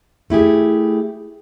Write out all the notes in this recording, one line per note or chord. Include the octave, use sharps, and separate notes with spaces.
A3 E4 G4 G#4